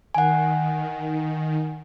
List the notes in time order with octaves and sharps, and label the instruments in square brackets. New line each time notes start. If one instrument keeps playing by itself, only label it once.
[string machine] D#3 [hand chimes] F#5 G#5